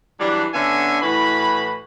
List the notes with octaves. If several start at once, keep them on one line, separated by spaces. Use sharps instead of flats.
E3 F#3 G3 D4
D3 B3 C#4 D4 E5 G#5
A2 E3 F#4 B4 B5